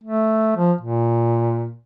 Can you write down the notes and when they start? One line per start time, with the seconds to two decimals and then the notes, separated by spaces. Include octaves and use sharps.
0.04 A3
0.56 F3
0.81 A#2